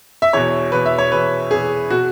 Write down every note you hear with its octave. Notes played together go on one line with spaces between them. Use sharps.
E5
E2 B2 C#5
E2 B2 B4
E5
C#5
E2 B2 B4
E2 B2 G#4
B2 F#4